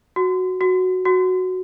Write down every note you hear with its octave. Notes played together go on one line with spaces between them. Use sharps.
F#4
F#4
F#4